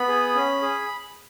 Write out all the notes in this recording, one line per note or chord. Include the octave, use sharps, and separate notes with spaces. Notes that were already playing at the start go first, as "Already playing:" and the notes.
Already playing: B3 B5
G#4
C#4
G#4